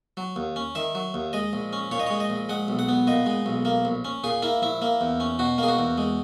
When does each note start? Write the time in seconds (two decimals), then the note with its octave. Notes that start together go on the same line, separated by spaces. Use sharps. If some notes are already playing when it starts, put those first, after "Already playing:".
0.17 F#3
0.36 D#2
0.56 C#4
0.75 D#3 E5
0.95 F#3
1.14 D#2
1.33 G#3 D#5
1.53 A#1
1.73 C#4
1.91 A#2 C#5
2.00 D#5
2.07 G#3 C#5
2.20 D#5
2.30 A#1
2.49 G#3 F#5
2.68 B1
2.79 F#5
2.89 B3
3.07 A#2 D#5
3.26 G#3
3.46 B1
3.65 A#3
3.85 A#1
4.05 C#4
4.24 A#2 G#4
4.42 A#3 E4
4.62 A#1 E4
4.82 A#3
5.01 E2
5.20 C#4
5.39 B2 F#4
5.58 A#3 G#4
5.68 F#4
5.79 E2
5.98 G#3